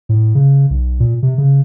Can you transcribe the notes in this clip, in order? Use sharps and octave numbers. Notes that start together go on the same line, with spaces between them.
A2
C#3
B1
A#2
C3
C#3